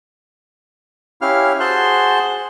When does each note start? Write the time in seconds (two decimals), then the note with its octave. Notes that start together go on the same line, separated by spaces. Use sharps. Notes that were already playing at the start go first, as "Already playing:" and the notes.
1.21 C#4 E4 G4 F5 F6
1.60 F#4 G#4 C5 A5 C6 F#6